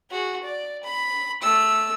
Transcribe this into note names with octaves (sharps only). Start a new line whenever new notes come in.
F#4 G#4
D5
B5
A3 E6